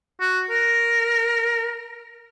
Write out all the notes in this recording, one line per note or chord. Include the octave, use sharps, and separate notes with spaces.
F#4
A#4